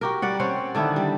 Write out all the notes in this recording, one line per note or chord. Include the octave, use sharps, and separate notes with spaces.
F#4 G4 A#4
G3 D5 F#5
C4 C#4 C5 F#5
D3 D#3 D4 E4
G3